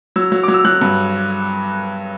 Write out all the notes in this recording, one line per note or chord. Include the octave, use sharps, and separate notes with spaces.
F#3 E6
F#3
F#3 D6
E6
F#3 F#6
G2